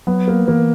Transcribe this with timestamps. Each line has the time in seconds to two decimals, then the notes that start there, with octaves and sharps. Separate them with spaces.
0.07 F#3 B3
0.28 A#3
0.48 E3 A#3